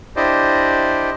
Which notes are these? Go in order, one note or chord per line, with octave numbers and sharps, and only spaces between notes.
D4 E4 G4 C5 D5 D#5